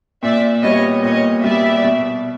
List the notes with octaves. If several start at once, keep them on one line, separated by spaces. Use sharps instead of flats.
A#2 D5 E5
G3 B3 C#5 D#5
A#2 C#5 D#5
G3 B3 D5 E5
B2